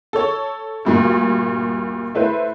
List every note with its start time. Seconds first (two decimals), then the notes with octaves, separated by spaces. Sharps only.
0.13 A4 C#5
0.85 D2 G2 A#2
2.15 A3 E4 B4 C5